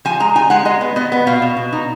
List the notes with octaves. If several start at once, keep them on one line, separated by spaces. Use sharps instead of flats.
F3 G#5
G#3 A#5
D#4 G#5
G#3 F#5
G#3 D#5
B3
B3 D#5
B3
B2 F5
B2
B2
D#4